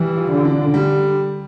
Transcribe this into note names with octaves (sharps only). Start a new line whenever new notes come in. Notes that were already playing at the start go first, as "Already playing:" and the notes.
Already playing: E3 G3
F4
D3
D4
G3